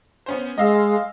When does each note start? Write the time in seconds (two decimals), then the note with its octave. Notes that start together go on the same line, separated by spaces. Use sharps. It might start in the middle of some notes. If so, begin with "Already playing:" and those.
0.26 B3 C#4 C5
0.58 G#3 D#5 F5 E6